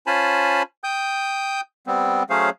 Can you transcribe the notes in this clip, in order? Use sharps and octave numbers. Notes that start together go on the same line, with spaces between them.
C#4 F4 C5 G#5 A5 B5
G5 D#6 G6
G3 B3 C4
F#3 A3 C#4 G#4 C5 F5